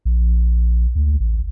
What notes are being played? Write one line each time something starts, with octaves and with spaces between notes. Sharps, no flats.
A#1
D2
A1